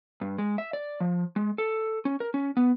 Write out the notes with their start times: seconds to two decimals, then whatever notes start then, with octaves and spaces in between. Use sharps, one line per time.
0.21 G2
0.38 G#3
0.58 E5
0.73 D5
1.00 F3
1.36 G#3
1.58 A4
2.05 C#4
2.20 A#4
2.34 C#4
2.57 B3